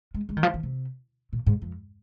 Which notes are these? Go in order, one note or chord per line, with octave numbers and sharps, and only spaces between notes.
G#3
G#3
D#3
F3
D#3
C3
A#2
G#2
F2